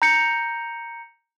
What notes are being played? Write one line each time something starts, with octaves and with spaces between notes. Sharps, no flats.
A#5 G6 C#7